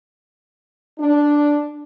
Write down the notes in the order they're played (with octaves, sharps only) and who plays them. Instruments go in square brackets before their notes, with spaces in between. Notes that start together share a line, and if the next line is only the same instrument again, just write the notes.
[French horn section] D4